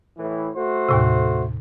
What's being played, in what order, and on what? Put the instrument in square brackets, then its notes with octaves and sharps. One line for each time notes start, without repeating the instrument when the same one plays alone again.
[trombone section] A2 E3
A3 F#4 C5
[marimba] D#2 A2 C3